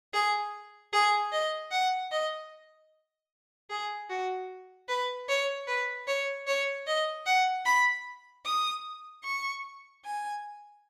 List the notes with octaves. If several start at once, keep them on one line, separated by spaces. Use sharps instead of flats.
G#4
G#4
D#5
F#5
D#5
G#4
F#4
B4
C#5
B4
C#5
C#5
D#5
F#5
B5
D#6
C#6
G#5